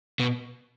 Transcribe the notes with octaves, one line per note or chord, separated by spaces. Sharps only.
B2